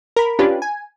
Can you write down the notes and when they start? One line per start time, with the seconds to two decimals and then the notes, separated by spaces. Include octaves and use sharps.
0.16 A#4 B5
0.39 C#4 D4 F4 G4 B4
0.62 G#5